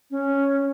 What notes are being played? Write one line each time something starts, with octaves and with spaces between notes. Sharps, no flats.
C#4